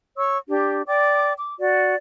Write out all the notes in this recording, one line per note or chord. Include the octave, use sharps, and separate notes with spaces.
C#5 C#6 E6
D4 G4
D5 G5 D6
D6
F#4 D5